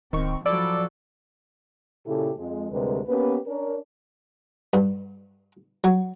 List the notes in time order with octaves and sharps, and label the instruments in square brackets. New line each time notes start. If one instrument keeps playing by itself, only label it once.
[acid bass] D1 [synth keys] D#3 C#6 [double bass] C4
[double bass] F3 F#3 [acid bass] E4 [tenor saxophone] A4 [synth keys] D5
[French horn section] A#2 C#3 E4 G4 A4
F2 G#3
D2 C3 G3 G#3 A#4 B4
A#3 B3 C#4 G4 B4
C#4 D4 A#4
[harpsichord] G2
F#3